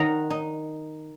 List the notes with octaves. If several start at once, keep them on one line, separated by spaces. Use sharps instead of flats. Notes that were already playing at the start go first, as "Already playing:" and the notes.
Already playing: D#3 F#5 A#5
D#4